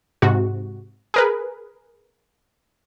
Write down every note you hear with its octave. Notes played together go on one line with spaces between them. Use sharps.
G#2 C3 F#4
G#4 A#4 B4